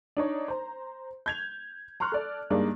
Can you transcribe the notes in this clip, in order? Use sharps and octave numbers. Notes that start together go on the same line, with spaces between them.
D4 D#4 C#5
C5 A#5
G6 G#6 F7
A#5 C6 C#6 F6 F#6
A4 D5
G2 G3 G#3 A#3 D4 D#4